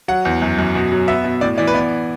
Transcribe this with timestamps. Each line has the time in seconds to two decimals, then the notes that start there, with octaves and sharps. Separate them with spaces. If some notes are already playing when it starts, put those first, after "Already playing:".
0.08 F#3 F#5
0.25 E2
0.42 F#2
0.58 F#2
0.75 B2
0.92 F#3
1.08 B3 E5
1.24 B2
1.41 A2 D5
1.58 E3 D5
1.67 B4
1.74 B3 D5